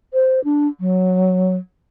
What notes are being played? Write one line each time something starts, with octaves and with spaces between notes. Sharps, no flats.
C5
D4
F#3